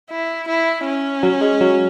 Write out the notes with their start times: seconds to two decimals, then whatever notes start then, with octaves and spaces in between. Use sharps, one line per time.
0.10 E4
0.48 E4
0.86 C#4
1.23 F#3
1.41 G#3
1.61 F#3